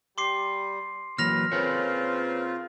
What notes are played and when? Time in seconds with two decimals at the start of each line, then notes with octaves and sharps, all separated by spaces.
0.18 G3 C6 D6 C7
1.18 E3 F#3 A#3 B4 F6 A#6 F7
1.52 C#3 A#3 C4 F4 A#4 B4 C#5